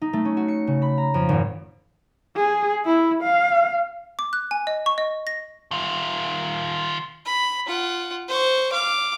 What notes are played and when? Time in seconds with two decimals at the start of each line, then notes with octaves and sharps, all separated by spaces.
0.02 D#4
0.13 A3
0.25 C#4
0.37 F#4
0.48 C#7
0.67 C#3
0.82 B5
0.98 A#5
1.14 F2
1.29 G#1
2.36 G#4
2.86 E4
3.23 F5
4.19 D6
4.33 F#6
4.51 G#5
4.67 D#5
4.86 C#6
4.98 D#5
5.27 A#6
5.71 D#3 F4
7.26 B5
7.67 F4 F#5
8.29 C5 C#6
8.72 F5 D6